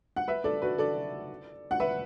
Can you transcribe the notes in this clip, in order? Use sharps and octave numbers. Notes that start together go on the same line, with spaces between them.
F#5
B4 E5
A4 D5
F#4 B4
A4 D5
F#5
B4 E5